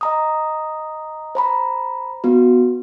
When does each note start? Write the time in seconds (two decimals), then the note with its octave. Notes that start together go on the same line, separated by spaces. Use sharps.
0.01 D#5 A#5 D#6
1.35 C5 A#5 B5
2.24 B3 F#4